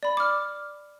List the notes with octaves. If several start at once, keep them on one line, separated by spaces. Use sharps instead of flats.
D5 B5
D6 F6